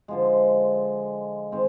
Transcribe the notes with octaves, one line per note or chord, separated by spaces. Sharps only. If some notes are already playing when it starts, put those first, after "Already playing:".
D3 F3 G#3
D#3 G#3 C4